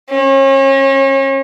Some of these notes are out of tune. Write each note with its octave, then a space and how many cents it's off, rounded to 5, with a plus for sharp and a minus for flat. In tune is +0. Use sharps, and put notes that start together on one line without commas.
C#4 -35